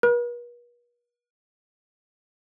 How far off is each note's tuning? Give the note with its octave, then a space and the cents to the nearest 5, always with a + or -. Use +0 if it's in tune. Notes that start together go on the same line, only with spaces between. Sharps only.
B4 -45